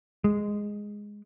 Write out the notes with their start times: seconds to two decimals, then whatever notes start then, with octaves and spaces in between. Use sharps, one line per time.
0.24 G#3